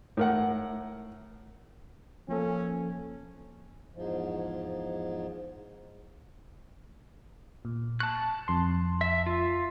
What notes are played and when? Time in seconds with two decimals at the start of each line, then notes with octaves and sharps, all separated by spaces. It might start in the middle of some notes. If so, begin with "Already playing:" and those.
0.17 A2 A#4 F#5
2.29 F3 A#3 C#4 A4
3.93 E2 G#2 F3
7.65 A#2
8.00 A5 C#6 F#6
8.48 F2 C6
9.01 E5
9.26 F4